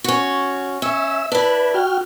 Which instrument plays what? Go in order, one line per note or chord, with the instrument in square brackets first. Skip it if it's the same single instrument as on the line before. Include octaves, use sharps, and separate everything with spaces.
[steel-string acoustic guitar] C#4 F#4
[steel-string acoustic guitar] C#4 [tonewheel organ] E5 E6
[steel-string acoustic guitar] D4 E4 [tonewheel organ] B4
[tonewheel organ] F#4 G5 F6